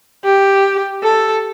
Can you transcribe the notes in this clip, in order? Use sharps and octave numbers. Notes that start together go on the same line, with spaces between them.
G4
A4